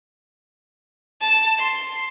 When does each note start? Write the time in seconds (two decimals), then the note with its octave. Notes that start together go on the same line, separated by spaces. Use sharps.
1.21 A5
1.59 C6